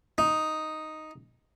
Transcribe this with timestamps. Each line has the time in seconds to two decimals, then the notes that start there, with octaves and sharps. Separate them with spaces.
0.18 D#4